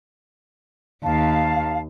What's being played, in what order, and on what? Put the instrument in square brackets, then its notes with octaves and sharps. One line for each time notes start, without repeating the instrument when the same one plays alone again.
[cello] D#2 [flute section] F5 [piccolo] A5